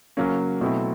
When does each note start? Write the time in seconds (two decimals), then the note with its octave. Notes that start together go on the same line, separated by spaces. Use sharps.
0.17 C#3 F#3 A#3 C#4
0.61 B2 F#3 A3 C4 E4